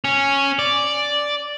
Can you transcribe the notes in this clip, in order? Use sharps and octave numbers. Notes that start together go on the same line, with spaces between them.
C#4
D5